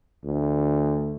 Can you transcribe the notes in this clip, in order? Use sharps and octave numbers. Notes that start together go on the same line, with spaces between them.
D2